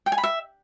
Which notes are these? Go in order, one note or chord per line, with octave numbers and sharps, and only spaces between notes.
G5
G#5
B5
E5